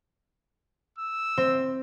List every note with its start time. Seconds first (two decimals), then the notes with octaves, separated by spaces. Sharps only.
0.98 E6
1.38 C4